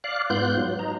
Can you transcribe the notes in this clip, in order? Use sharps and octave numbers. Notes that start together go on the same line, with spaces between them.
D5 F5 F#6
G#2 B3 F4 F#6 G6
F#3
D#4 A#5